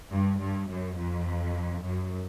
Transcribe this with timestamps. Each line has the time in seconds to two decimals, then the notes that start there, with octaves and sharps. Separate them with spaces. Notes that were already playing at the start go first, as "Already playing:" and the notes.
0.10 G2
0.40 G2
0.69 F#2
0.96 F2
1.83 F#2